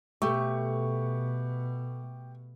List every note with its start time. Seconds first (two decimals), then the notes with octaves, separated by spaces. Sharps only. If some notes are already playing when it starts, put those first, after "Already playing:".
0.22 B2 A3 G4 C#6